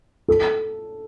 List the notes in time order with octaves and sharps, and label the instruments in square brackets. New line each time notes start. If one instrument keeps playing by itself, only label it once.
[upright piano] A4